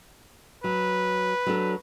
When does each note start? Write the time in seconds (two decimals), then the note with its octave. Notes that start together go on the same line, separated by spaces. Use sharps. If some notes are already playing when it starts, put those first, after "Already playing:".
0.64 F#3 B4
1.46 F#3 D4 A4